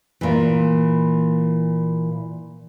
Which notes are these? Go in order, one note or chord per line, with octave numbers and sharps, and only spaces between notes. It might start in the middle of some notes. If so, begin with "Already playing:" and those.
A#2 E3